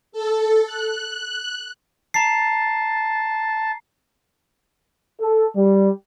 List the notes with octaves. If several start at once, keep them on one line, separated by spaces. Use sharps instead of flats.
A4
F#6
A5 A#5 C7
A4
G3